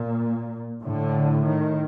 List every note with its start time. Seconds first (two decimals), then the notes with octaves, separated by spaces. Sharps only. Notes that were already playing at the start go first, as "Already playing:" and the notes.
Already playing: A#2
0.83 A2 D3
1.45 D#3